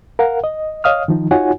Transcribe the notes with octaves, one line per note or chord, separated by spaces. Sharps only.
A#4 F5 F#5
D#5
C#5 D#5 F5 D#6 F6
D#3 F3 D#4
D#4 F4 F#4 C#5 F#5 G#5